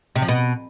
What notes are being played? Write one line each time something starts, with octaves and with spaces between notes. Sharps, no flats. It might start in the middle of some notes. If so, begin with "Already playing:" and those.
C3
F3
B2